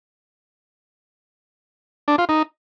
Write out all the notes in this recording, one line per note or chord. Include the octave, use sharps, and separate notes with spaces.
D4
F4
D#4